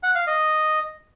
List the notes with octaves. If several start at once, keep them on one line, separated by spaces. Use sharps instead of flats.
F#5
F5
D#5